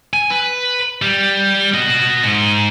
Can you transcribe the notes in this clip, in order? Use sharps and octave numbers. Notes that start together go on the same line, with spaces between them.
G#5
B4
G3
F#4 D#5
G#2